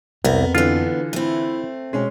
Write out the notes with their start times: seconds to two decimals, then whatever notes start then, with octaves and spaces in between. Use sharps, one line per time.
0.24 C2 F2 B3 A#4
0.55 D3 E3 B3 D4 F4
1.13 A3 C4 E4
1.93 B2 G#3 C#4